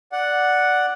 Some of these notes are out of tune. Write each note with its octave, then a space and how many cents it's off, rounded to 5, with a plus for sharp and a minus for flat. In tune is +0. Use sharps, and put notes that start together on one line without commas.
D5 +0 F#5 +0